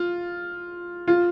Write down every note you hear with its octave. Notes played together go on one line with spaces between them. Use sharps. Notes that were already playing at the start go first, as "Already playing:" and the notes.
Already playing: F4
F4